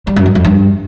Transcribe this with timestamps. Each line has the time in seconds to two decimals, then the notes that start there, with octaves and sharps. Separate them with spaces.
0.07 G3
0.16 F#2
0.26 G2
0.35 F2
0.44 G2